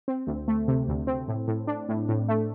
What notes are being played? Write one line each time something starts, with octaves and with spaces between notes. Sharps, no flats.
C4
D2
A3
C3
D2
C4
A2
A2
D4
A2
A2
A3